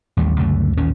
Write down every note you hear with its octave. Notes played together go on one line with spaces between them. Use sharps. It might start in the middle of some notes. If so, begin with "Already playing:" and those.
A1 D#2 G3
C#2 F#2 D3 A3
A1 D#2 A#2 C#4